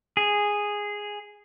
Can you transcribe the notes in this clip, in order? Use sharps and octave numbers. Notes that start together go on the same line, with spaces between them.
G#4